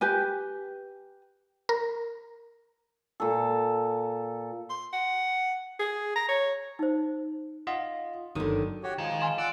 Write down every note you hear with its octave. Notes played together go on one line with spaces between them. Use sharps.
G4 B4 G#5
A#4
A#2 A4
C6
F#5
G#4
A#5
C#5
D#4 C5
F4 D#5 F#5
G1 D3 D#3 F#3 D#6
F#4 G4 C#5
D#3 F3 G#3 G#6
G#5 C6 E7
D5 F#5 D6 E6